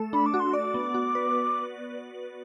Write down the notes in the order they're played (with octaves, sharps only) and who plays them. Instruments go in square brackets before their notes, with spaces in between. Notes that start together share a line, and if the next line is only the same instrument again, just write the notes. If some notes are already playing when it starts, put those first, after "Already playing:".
Already playing: [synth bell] A3 A4
[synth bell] D4 [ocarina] B5
[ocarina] D6
[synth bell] F#4
[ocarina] C6
[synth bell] D5 [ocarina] D6
[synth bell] B3
F#4
B4